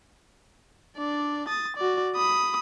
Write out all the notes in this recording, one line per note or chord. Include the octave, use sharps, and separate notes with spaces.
D4 D5
D#6 A6
F#4 D5
B5 D#6